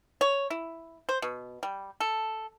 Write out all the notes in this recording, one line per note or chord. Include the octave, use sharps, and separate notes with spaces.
C#5
E4
C5
B2
G3
A4